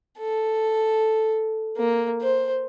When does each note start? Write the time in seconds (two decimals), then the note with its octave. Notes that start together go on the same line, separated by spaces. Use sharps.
0.19 A4
1.77 A#3
2.21 C5